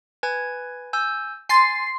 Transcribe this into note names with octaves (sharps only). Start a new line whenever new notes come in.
B4 G#5 G#6
G#5 E6 G6
G#5 C6 A6 C7